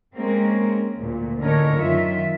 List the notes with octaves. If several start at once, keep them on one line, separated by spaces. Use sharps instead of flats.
G#3 A#3 C4 C#4 A#4
D2 A#2
A2 D3 C#4 A#4 C#5 D#5
F#2 D#3 F4 E5